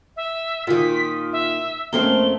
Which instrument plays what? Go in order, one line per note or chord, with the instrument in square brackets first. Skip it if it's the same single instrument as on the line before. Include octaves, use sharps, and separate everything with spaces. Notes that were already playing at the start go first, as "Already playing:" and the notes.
[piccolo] E5
[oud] A#2 D#3 [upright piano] F4 [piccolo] B6
[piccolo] E5
[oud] F2 A3 C4 [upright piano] A#3 C#4 [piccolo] G7